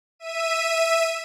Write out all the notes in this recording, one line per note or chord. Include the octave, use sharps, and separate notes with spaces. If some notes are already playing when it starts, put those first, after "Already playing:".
E5 D#7